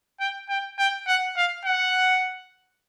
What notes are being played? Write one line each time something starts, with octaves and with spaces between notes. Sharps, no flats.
G5
G5
G5
F#5
F5
F#5